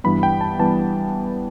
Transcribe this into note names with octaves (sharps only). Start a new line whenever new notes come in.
G2 E3 G3 B3 B5
G5
A5
E3 G3 B3 A5